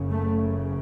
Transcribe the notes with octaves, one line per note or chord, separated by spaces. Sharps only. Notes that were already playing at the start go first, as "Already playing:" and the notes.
Already playing: F#1 F#2 C#3
A3